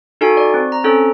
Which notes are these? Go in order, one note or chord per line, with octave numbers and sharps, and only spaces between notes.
D#4 F#4 A4 G#5
D5
C4
A#5
C4 C#4 A4